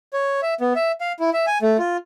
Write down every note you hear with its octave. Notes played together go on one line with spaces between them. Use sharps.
C#5
E5
B3
E5
F5
E4
E5
G#5
A3
F4